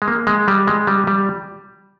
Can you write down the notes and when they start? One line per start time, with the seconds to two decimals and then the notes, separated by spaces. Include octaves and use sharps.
0.02 G#3
0.08 A#3
0.27 G#3
0.48 G3
0.67 G#3
0.87 G3
1.07 G3